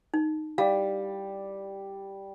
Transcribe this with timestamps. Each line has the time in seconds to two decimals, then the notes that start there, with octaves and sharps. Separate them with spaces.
0.14 D#4
0.58 G3 F5